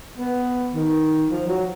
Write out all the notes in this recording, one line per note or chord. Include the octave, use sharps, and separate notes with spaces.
B3
D#3
F3
F#3